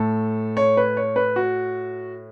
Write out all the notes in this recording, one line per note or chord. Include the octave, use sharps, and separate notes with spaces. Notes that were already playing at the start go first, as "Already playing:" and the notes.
Already playing: A2 A3 A4
C#5
B4
C#5
B4
F#4